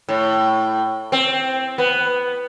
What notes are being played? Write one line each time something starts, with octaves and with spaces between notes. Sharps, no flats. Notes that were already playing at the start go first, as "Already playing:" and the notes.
A2
C4
B3